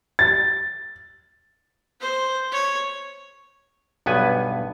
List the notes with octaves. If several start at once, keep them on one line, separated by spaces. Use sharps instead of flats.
A6
C5
C#5
B1 G2 B3 B4 G#5